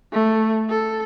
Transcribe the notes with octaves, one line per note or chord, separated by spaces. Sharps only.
A3
A4